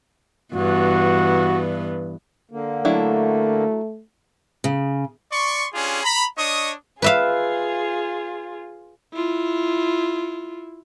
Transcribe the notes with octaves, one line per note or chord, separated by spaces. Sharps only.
G2 E3 B3 F#4
D3 A#3
F#3 A3 D4 E4
C#3
D5 C6 C#6
C#4 D4 F4 G4 G#4
A#5 B5
D4 C#5 D#5 C#6 D#6
F4 G#4 B4 E5 F5
E4 F4